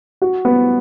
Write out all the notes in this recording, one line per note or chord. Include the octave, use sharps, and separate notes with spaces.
F#4
B3